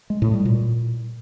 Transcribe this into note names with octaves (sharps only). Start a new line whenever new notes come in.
G#3
A2
G3
A#2